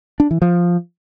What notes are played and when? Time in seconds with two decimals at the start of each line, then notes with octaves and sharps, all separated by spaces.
0.20 D4
0.31 E3
0.42 F3